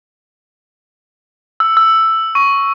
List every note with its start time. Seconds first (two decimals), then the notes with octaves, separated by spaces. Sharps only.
1.60 E6
1.77 E6
2.35 C#6